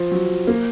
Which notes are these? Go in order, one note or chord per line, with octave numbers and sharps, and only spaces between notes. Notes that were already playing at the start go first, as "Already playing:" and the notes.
Already playing: F3
F#3
A#3